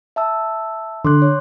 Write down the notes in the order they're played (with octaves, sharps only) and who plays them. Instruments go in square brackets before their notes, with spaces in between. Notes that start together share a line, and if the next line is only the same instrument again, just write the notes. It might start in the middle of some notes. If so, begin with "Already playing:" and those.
[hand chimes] E5 A5 E6
[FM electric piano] D3 [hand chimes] C6 D6 F#6
[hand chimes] C#5